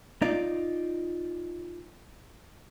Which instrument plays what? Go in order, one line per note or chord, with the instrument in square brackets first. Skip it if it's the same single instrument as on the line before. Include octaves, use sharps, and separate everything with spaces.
[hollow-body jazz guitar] D#4 F4 D5